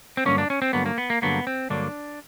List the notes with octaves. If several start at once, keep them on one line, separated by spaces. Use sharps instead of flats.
C4
G2 D3 F#3 A#3 C#4
D4
C#4
C4
G2 D3 F#3 A#3 B3
A#3
B3
A#3
G2 D3 F#3 A#3 B3
C4
G2 D3 F#3 A#3 D4